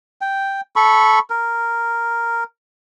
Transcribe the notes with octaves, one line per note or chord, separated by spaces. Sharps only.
G5
A4 B5 C#6
A#4